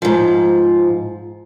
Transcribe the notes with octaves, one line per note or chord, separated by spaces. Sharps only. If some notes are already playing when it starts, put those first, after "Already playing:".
G#2 F3